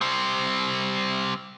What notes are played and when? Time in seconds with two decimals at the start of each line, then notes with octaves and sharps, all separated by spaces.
0.01 G3 C4